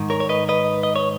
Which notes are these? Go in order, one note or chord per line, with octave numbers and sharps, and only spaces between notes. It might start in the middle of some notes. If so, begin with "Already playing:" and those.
Already playing: G#2 D#3
A#4 C#5
C#5
B4 D#5
B4 D#5
D#5
C#5